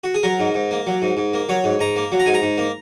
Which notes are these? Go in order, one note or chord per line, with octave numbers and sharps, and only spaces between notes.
F#4
G#4
F#3 A#4
G#2
G#2
A#3
F#3
G#2
G#2
A#3
F#3 C#5
G#2
G#2 A#5
A#3
F#3
A#5
G#2 G#5
A#5
G#2
A#3